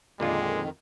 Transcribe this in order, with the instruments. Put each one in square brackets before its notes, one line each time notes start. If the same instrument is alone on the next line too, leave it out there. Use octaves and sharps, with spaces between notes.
[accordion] F2 D#3 [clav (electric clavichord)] A#2 D3 F4 [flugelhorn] G#3